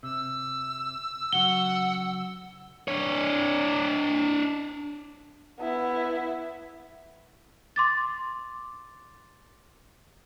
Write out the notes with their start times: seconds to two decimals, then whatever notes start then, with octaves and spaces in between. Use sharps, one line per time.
0.03 C3 E6
1.33 C#3 F#3 F#4 F#5 G7
2.88 D4 C#5
5.60 B3 E4
7.76 C6 D6 A6